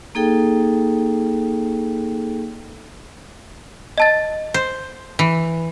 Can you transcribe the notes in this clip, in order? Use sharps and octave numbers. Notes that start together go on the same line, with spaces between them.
A#3 D#4 G#4 A4 G5
D#5 A5 A6
C5
E3